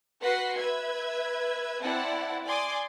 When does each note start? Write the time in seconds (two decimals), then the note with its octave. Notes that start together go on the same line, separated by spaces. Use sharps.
0.21 F#4 B4 F#5 C6 B6 C7
0.56 B4 E5 G#6
1.81 C4 E4 D5 F#5 A5
2.44 D5 G#5 C6 D6 D#6